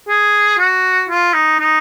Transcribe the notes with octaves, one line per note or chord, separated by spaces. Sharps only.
G#4
F#4
F4
D#4
D#4